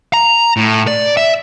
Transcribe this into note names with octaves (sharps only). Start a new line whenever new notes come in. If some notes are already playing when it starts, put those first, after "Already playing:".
A#5
A2
D5
E5